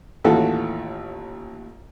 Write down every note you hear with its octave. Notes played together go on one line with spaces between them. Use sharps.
A1 D#2 E3 F4 F#4 A4